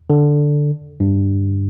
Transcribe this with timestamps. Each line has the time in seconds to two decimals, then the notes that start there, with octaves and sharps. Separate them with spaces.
0.10 D3
1.00 G2